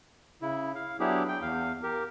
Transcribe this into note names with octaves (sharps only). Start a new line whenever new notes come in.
C#3 E4
F5
F#3 B3 D4 E4 G4 G#4
G5
E2 F5
G4 A#4